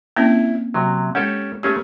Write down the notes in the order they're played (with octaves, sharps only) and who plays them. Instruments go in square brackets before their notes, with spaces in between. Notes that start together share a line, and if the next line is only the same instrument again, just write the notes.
[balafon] A#3 C4 C#4 [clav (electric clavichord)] E4
[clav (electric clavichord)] C3 F#3
[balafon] G#3 [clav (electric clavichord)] C#4 G4 A4
[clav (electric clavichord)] A3 C#4 G#4 [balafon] G4